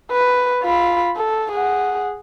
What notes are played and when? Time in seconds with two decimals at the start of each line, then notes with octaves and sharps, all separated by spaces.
0.12 B4
0.63 F4 B5
1.17 A4
1.52 G#4 F#5